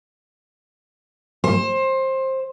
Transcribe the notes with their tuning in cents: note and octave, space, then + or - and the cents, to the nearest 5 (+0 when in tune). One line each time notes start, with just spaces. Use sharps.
C5 +20